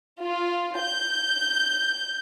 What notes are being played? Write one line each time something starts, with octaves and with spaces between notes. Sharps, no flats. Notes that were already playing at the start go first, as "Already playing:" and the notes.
F4
G6